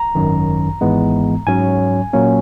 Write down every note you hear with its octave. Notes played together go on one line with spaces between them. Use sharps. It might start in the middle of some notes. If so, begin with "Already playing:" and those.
Already playing: A#5
G#1 F#2 D#3
G#1 G#2 E3 G#3 B3
G#2 F#3 C#4 G#5
A#2 F#3 A#3 C#4